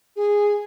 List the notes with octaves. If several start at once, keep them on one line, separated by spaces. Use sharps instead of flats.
G#4